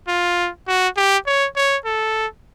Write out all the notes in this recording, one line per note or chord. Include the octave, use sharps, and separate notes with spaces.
F4
F#4
G4
C#5
C#5
A4